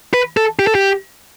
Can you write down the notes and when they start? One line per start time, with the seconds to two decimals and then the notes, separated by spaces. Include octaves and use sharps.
0.14 B4
0.37 A4
0.59 G4
0.67 A4
0.75 G4